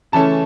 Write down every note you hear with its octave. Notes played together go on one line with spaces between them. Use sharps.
C#3 E3 A3 C#4 A5